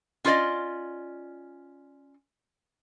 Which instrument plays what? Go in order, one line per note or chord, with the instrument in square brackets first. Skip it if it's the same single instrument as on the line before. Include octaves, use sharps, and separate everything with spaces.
[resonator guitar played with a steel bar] C#4 F4 G4 C5 D5 D#5